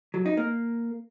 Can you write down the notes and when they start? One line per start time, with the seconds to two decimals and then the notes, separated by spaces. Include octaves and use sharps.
0.14 F#3
0.26 D#4
0.37 A#3